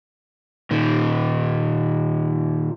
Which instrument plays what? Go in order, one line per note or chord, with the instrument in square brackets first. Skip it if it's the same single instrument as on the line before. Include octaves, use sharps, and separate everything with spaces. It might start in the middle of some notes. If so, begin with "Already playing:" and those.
[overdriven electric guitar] A#2 D#3